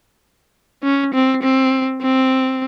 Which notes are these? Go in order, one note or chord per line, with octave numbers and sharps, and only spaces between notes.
C#4
C4
C4
C4